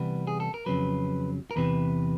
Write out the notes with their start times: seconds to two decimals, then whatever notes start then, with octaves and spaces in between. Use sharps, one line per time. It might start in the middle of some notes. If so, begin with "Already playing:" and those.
Already playing: C3 E3 G3 B3 B4
0.27 G#4
0.40 A4
0.54 A#4
0.66 F2 C#3 F#3 B4
1.51 A#4
1.56 E2 C3 E3 B4